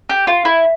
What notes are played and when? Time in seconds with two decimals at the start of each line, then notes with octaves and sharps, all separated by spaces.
0.09 G4
0.27 F4
0.45 E4